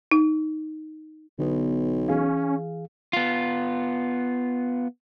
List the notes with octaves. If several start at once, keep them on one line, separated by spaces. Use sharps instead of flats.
D#4
B1 D3 B3
E3 C#4 G#4 F5
B3 F4